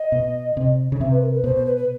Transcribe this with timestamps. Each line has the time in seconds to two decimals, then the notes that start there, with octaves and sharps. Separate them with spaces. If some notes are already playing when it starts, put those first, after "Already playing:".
Already playing: D#5
0.12 B2
0.57 C3
0.92 C#3
1.00 C3 E5
1.11 B4
1.22 A#4
1.34 B4
1.44 B2 C5
1.56 C5
1.66 B4
1.77 B4